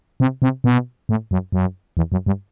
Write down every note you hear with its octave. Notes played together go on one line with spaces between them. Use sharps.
C3
C3
B2
A2
F#2
F#2
E2
F#2
G2